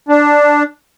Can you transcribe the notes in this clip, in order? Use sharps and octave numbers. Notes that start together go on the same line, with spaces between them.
D4